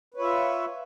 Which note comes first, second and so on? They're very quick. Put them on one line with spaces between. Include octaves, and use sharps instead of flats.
B4 C#5 F4 E5